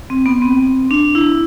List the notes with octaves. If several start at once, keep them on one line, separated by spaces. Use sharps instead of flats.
C4
B3
C4
D4
E4